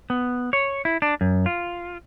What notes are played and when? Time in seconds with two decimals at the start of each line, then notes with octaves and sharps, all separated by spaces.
0.10 B3
0.53 C#5
0.85 E4
1.02 D4
1.21 F#2
1.46 F4